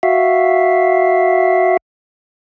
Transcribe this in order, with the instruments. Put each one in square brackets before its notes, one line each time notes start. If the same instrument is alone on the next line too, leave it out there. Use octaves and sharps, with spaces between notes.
[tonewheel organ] F#4 E5 F5